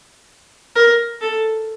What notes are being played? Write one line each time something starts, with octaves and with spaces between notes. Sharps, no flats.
A#4
A4